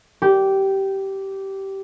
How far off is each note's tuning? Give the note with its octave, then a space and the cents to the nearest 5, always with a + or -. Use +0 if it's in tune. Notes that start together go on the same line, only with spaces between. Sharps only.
G4 -15